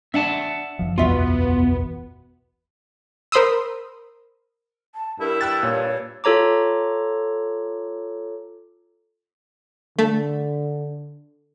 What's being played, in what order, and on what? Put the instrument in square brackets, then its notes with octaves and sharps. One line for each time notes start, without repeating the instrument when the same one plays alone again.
[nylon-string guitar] D4 [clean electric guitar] E5 F#5 A5
[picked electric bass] F#1 F3
[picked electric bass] F#1 B1 E2 [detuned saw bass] B3 [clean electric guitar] F4 [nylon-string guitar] F#4 E5
[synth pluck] A#4 C5 B5 C6 D#6 E6
[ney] A5
[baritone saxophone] G2 [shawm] E4 [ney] A#4
[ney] G5 [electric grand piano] E6 F#6 A6
[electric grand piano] A#2 [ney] C#5
[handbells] F4 A4 C#5 A#5 D6
[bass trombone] D3 [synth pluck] A3